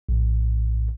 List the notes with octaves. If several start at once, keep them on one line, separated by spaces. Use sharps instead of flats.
A#1 A2